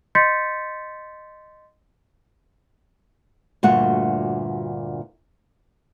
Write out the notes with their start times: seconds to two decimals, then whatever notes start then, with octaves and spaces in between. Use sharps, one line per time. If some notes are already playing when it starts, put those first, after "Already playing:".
0.15 D#5 C6 G6 A6 B6 C#7
3.63 D2 G2 A#2 F#4 F#5